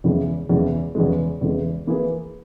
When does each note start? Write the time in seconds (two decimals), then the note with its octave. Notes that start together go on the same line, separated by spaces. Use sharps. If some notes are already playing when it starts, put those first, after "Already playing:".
0.04 E2 C#3 E3 G#3
0.49 E2 C#3 E3 G#3
0.95 E2 C#3 E3 G#3
1.41 E2 C#3 E3 G#3
1.87 E3 A#3 E4 G#4 B4